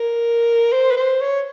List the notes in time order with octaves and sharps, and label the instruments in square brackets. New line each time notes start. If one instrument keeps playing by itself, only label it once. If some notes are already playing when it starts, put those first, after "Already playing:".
Already playing: [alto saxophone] A#4
C5
B4
C5
C#5